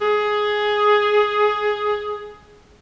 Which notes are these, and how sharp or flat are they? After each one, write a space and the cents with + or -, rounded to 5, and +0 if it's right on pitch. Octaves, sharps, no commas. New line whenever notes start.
G#4 +10